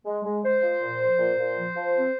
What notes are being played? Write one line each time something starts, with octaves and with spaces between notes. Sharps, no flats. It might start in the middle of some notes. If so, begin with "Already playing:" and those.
G#3
G#3
G#3 C5
F3
A#2
F3
A#2
A#2
F3
F3
C4